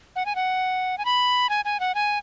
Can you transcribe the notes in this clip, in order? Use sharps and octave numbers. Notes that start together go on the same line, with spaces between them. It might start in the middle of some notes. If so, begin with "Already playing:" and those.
F#5
G#5
F#5
G#5
B5
G#5
G#5
F#5
G#5